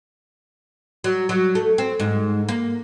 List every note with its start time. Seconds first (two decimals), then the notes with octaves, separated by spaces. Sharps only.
1.04 F#3
1.29 F#3
1.55 A3
1.78 C4
2.00 G#2
2.49 A#3